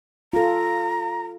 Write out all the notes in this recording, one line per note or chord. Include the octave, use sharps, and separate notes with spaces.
F4 A4 A#5